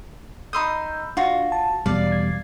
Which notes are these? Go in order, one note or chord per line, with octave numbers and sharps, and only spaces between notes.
D#4 B5 C6 D#6 E6 G6
D4 F4 F#4
A5
E2 B2 G3 D5 F5
G#6